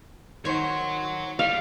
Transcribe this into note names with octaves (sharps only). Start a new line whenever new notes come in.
D#3 C5 C#5 F#5
G3 F5